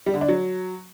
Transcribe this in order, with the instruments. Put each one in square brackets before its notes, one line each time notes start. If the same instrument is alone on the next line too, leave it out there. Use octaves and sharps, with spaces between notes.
[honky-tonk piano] G3
D3
D4
F#3